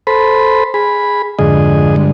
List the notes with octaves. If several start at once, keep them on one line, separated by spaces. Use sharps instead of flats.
A4 C5 B5
G#4 B5
F2 G#2 D3 G#4 D#5
G2 D3 G#3